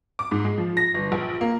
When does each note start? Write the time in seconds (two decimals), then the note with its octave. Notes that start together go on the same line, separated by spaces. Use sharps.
0.19 D6
0.31 G#2
0.44 G#3
0.58 F3
0.77 A#6
0.94 G1
1.12 A#1
1.41 A#3